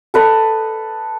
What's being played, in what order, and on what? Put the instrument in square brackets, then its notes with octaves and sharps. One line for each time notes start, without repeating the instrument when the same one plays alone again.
[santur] A4 B4 D#5